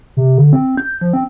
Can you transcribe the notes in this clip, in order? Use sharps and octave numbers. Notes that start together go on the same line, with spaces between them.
C3
D3
C4
G6
F3
C4